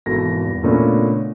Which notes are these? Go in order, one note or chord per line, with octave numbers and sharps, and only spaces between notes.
G#1 B2 E3 A4 A#6
E2 G2
A#2 C#3 A3 B3 C#4 D4